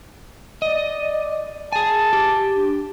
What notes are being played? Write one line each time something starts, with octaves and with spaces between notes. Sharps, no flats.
D5 D#5
G#4 G#5 A5
G4
D4